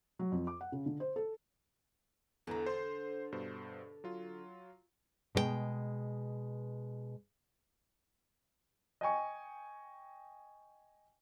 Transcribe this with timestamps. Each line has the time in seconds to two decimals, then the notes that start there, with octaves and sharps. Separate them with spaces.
0.19 F#3
0.32 F2
0.47 D6
0.61 F#5
0.72 C#3
0.86 D3
1.00 C5
1.16 A4
2.47 E2 D3 E3 A4 A#5
2.66 C5 C6
3.32 G2 B2 C5
4.04 F#3 F4
5.35 B2 G#3 C5 G5
9.01 D#5 G5 G#5 C#6